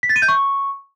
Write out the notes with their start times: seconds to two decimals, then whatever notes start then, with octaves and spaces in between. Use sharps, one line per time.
0.03 B6
0.09 A6
0.16 D#7
0.22 G6
0.28 C#6